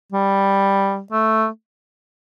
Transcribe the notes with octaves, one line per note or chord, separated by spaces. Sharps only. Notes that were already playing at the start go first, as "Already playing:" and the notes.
G3
A3